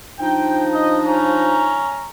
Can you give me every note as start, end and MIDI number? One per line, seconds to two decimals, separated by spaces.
0.19 1.85 53
0.19 1.85 62
0.19 1.85 63
0.19 0.66 79
0.74 0.97 75
1.06 2.10 61
1.06 2.10 82